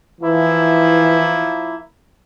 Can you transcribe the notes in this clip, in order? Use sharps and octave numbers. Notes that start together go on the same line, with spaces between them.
E3 F3 A#3 E4